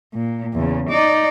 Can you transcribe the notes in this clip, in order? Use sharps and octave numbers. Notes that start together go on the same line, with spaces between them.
A#2
E2 C#3
D#4 D5